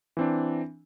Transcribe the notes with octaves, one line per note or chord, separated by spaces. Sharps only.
E3 C4 D4